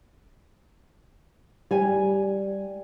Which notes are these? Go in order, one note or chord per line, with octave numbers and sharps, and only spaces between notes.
G3 G#5